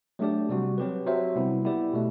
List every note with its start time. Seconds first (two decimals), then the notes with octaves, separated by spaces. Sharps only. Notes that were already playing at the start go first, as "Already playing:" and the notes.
0.19 F#3 A3 D4 G4 D5
0.49 C3 G3 C4 F#4
0.78 F#3 C4 G4 B4
1.07 F#3 C4 F#4 C5 E5
1.36 C3 G3 B3 E4
1.65 B3 E4 G4 D5
1.93 B2 A3